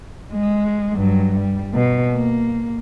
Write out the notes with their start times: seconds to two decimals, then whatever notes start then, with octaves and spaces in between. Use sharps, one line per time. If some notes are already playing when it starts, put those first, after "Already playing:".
0.33 G#3
0.95 G2 F#3
1.39 G3
1.74 B2
2.14 A#3